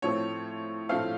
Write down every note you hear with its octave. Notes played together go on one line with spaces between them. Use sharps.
A2 F3 A3 C4 C#5
A2 F3 A3 C4 F5